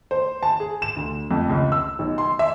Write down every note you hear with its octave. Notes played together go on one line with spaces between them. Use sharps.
C5
A5
G#4
E7
D2
F2
C#2
E6
B1
C6
E5